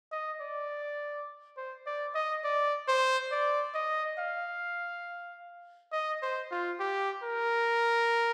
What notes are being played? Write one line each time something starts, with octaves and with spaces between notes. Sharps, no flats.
D#5
D5
C5
D5
D#5
D5
C5
D5
D#5
F5
D#5
C5
F4
G4
A#4